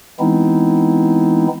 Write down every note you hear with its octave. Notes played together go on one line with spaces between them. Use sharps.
E3 G#3 B3 C4 D#4 E4